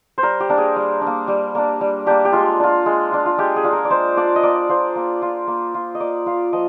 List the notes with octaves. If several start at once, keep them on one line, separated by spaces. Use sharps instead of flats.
C5
G3 A#4
G4
A#3 D4 A#4
G#4
G3
D4
A#3
G3
A#3 D4
G3
A#3 D4 G4
G4
G#3 F4
D4 F4
G#3
D4 F4
F4
G#3 G4
G#4
D4 F4
A#4
D5
G#3 C5
D4 F4 D5
D#5
A#3 D5
F4 C5
A#3
F4
A#3
F4
D#5
A#3 D5
F4 F5
F3 D#5